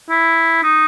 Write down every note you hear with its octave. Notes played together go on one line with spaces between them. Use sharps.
E4
D#4